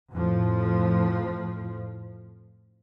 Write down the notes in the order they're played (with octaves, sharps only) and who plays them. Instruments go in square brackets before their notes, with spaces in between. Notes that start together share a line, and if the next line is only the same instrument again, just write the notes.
[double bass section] F2 A2 F3